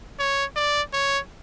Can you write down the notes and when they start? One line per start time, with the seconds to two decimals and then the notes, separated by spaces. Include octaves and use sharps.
0.19 C#5
0.56 D5
0.93 C#5